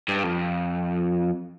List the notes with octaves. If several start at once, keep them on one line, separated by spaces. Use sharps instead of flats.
G2
F2